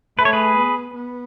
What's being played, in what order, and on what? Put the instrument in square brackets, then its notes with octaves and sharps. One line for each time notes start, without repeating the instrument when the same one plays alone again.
[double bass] A3 [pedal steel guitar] B4
[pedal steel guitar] C#5
G#4 B4
[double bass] B3
B3